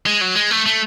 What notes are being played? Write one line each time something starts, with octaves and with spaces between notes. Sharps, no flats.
G#3
F#3
G#3
A3
A3